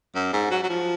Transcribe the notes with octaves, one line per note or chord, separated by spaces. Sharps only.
F#2
G#2
F#3
F#3
F3